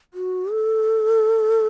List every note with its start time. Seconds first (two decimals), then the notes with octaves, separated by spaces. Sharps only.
0.14 F#4
0.52 A4